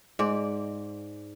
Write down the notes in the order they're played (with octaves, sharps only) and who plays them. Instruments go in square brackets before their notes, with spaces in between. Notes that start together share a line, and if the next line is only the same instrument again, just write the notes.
[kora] G#2 D5